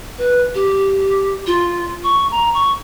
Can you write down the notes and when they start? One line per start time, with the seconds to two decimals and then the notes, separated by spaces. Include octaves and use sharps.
0.18 B4
0.55 G4
1.47 F4
2.04 C#6
2.31 A#5
2.54 C#6